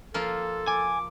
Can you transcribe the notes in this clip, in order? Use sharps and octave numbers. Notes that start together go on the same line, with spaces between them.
F3 A#3 F4 A4
G#5 D6